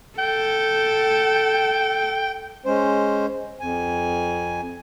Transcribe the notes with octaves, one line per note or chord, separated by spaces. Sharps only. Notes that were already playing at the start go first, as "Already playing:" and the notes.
A4 G5
G#3 C#4 C5
F2 G#5